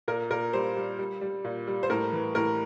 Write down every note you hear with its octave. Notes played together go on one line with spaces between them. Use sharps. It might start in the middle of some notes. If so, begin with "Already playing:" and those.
A#2 A#4
A#2 A#4
G3 C5
G3
G3
G3
A#2
G3
C5
A2 A#4
E3
A2 A#4